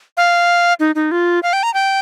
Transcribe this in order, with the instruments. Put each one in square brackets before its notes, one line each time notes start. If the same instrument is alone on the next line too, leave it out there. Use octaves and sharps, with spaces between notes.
[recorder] F5
D#4
D#4
F4
F5
G5
A#5
G5